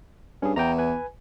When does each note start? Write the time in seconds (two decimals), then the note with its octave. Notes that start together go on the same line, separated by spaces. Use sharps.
0.42 G2 C#4 G#4
0.56 E2 G5 A#5
0.78 B4 G#5